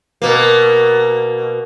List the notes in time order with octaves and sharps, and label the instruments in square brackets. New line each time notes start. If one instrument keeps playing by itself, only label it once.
[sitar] B2 A#3